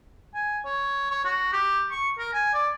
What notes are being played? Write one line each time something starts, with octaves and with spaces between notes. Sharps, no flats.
G#5
C#5
C#5
F#4
G4
C#6
A#4
G#5
D5